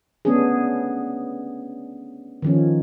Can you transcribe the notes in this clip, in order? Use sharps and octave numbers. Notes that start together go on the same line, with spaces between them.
A3 B3 C#4 D4 G#4
D#3 F3 C#4